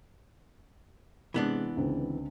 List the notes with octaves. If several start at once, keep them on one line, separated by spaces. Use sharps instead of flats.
C3 E3 G#3 B3 D4
C#2 D3 C4